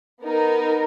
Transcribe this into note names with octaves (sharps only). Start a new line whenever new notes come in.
B3 D#4 A#4